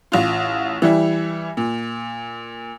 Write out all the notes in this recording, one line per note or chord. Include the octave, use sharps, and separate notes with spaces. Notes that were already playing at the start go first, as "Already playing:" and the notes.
A1 F4
E3 G3 E4
A#2